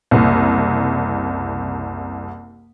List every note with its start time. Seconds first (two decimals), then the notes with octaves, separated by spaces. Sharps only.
0.11 F#1 C2